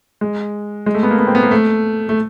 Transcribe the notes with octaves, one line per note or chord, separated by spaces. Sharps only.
G#3
G#3
A3
B3
A#3
B3
C4
B3
A#3
A3
A3